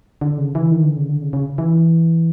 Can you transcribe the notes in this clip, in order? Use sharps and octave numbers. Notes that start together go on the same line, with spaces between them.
D3
C#3
E3
D#3
D3
C#3
D3
C#3
C#3
E3